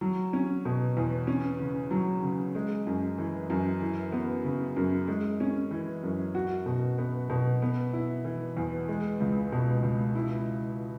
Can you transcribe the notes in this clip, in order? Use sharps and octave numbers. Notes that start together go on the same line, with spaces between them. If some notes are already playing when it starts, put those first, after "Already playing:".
F#3
C#4
B2
E2
C#4
C#3
F#3
C#3
G#3
F#2
E3
F#2
E3
B3
C#3
F#2
G#3
C#4
E3
F#2
F#4
B2
B3
B2
B3
E4
E3
E2
G#3
C#2
B2
C#2
E4